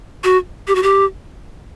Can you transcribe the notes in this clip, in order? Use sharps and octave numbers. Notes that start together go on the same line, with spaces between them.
F#4
G4
F#4
G4